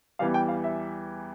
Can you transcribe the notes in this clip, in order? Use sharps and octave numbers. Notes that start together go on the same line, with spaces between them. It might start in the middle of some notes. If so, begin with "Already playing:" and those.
E2 E3 G3 F5
G5
F5
E5